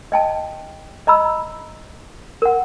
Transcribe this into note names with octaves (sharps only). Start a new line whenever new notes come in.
D#5 G5 A5
D#5 A#5 B5 E6
A#4 F#5